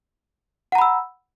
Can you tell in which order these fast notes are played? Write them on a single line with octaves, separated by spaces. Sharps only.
F#5 A#5 B5 E6